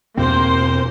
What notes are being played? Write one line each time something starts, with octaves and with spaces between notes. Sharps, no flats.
E2 B2 A#3 C4 C5